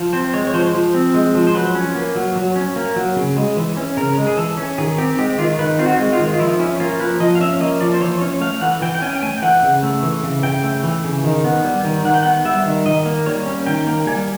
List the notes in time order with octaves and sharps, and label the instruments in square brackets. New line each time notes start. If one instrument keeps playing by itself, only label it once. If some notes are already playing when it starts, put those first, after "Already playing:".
Already playing: [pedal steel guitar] F3
C4 C5
G#3 C#5
C#5
F3 C5
F3
C4
G#3
F3
C5
F#3 B4
C#4
A#3
F#3
F#3
C#4
A#3
F#3
C#3
G#3
E3
C#4
C#3 A#4
G#3
G#4
E3 A4
C#4
D#3 G#4
C4 G4
G#3 G4
D#3 F4
D#3 B4
C4 F4
F#4
G#3
F4
D#3
F4
F3 E4
C#4 E4
A#3 F4
F3 B4
F3 D#5
F5
C#4 E5
A#3 D#5
F3 D5
C5
E3 C#5
C#4 C#5
A3 F5
E3 F#5
E3 G5
G5
C#4 G#5
G5
A3 G#5
G5
E3 F#5
C#3
A3
E3
C#3
C#3 G5
A3
E3
C#3
D#3
B3
G3
D#3
D#3 F#5
G5
F#5
B3
G3 E5
D#3
D#3 D#5
A#3
G3 C#5
C#4
D#3 G5
A#3
G3 G#5